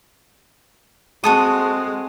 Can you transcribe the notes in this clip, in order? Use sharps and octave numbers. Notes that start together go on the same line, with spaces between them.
G#3 C4 F#4 A4 D#6